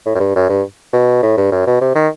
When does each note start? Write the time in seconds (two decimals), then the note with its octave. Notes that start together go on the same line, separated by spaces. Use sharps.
0.06 A2
0.15 F#2
0.20 G2
0.35 F#2
0.49 G2
0.93 B2
1.23 A2
1.37 G2
1.52 F#2
1.66 B2
1.81 C3
1.95 D#3